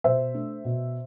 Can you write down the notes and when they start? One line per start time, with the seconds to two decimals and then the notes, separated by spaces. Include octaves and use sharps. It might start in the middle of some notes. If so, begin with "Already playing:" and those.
0.04 B2 C5 E5
0.34 A3 D4
0.65 B2